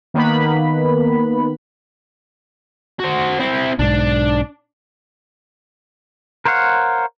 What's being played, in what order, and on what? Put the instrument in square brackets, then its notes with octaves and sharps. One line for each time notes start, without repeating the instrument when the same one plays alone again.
[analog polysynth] D#3 A#3 B3 B4 B5
[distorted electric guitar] F#4 C5
C4 E4
[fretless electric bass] B1 G#2 [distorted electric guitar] D4
[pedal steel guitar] A#4 C5 C#5 F5 F#5